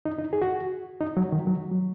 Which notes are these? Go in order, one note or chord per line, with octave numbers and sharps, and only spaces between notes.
D#4
D#4
G#4
F#4
D#4
F#3
D#3
F#3
F#3